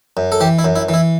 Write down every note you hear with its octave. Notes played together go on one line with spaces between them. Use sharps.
F#2
A4
E3 G4
E4
F#2
E4
E3
E4